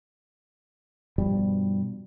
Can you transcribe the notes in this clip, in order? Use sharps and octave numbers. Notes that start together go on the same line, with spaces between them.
G2 B2 F3 G3